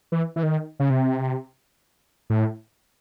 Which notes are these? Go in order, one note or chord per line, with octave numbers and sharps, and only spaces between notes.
E3
E3
D#3
C#3
C3
A2